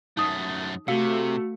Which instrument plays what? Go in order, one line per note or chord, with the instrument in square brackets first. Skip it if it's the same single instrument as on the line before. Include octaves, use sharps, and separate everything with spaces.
[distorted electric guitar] F#2 A3 [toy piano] D#4 D#6
[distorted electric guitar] C3 [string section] A3 [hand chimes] F#4 E6 C#7 [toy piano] F5